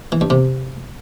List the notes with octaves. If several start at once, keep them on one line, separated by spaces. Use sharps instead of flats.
E3
G2
C3